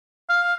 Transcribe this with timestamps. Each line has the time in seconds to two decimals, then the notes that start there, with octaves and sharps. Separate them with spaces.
0.29 F5